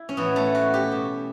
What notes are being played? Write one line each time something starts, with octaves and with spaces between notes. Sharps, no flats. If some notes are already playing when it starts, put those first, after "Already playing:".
Already playing: E4
C#4
A2 E3 B3
A3
F#4
G4
B2